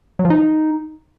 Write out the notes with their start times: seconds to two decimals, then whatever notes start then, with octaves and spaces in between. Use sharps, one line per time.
0.19 F#3
0.25 F3
0.30 D#4